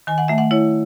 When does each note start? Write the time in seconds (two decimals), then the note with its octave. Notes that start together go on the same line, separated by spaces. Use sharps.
0.07 D#3 G#5
0.18 F#5
0.28 A3 E5
0.38 F#5
0.51 E4 C#5